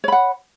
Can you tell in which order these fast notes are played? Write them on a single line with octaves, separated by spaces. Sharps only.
C#5 B5 F#5